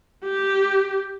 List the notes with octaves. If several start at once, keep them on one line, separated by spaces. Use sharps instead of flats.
G4